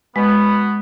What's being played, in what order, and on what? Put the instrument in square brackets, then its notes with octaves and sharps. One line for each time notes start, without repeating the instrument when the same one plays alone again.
[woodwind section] B2 B3 [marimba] G#3